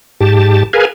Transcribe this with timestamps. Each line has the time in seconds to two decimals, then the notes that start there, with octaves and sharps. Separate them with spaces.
0.21 G#2 G4 A5
0.73 G#4 A#4 B4 F5 G#5